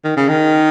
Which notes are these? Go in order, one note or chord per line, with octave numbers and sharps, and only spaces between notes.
D#3
C#3
D#3